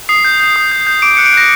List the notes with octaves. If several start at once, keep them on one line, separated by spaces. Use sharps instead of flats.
D#6 C7
G6
G6
D#6
G6
G6
D6 D7
F#6 C#7
D7
F#6 A#6